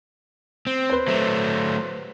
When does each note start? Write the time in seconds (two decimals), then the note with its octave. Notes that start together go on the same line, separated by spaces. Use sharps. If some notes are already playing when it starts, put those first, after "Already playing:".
0.67 C4
0.90 B4 C5
1.08 F#3 A3